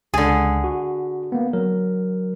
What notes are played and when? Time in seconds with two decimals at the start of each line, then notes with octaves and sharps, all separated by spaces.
0.14 C#2 D3 G#4
0.64 F#4
1.32 A#3 B3
1.53 F#3 A#4